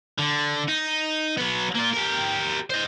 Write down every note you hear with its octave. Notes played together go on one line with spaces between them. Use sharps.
D3
D#4
F#3 B3
A#3 F4
G4 A#4
C5 D#5